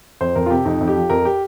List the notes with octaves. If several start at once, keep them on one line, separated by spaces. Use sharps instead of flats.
F2 C5
F2 A#4
F4
C3 G4
F2 D#4
F2
G4
F3
F2 A#4
G4